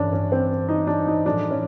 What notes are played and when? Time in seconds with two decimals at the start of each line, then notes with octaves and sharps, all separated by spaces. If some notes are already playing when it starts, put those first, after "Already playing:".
Already playing: A1 G2 E3 C#4 D4
0.13 C#4
0.32 C4
0.69 D#4
0.87 D4
1.07 D#4
1.26 A2 F3 G#3 D4
1.51 C#4